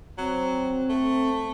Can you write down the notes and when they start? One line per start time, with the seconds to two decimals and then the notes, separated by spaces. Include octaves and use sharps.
0.18 F#3 C4
0.90 A3